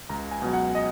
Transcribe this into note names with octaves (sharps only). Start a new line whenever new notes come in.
C#2 A#5
G#5
B2 F#3
F#5
D#5